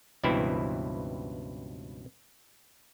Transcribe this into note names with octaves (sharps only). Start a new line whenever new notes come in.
C#2 G2 B2 E3 C4 E4